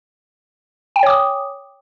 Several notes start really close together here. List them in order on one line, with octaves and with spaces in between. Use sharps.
G5 G#5 C#5 D6 D#6